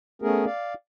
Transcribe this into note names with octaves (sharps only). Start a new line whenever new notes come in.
A3 B3 C#4 G#4 A#4
D5 F5